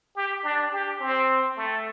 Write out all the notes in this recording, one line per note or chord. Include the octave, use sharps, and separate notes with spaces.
G4
D4
G4
C4
A3